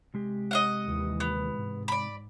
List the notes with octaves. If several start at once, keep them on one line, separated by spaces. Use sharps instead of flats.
C3 G#3 G4
D#5 F5 F#5
D#2 E3
B3
G#2
D5 B5